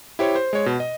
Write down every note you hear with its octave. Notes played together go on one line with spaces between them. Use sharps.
E4 G4 C5 C#5
C5
G#3 C#5
B2
D#5